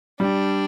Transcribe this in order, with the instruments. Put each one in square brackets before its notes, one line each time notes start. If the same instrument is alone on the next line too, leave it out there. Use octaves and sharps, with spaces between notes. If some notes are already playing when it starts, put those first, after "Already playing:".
[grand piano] G3 [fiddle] D4